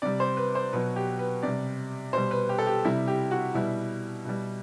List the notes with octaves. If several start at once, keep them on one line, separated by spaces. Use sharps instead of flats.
C3 G3 D5
C5
B4
C5
B2 F#3 B4
G4
B4
C3 G3 D5
B2 G3 C5
B4
G4
A4
G4
C3 G3 E4
G4
F#4
B2 G3 E4
B2 G3